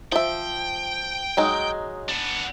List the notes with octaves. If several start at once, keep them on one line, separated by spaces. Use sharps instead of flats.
F3 E5 G5
F#3 G#3 D#4
B3 D4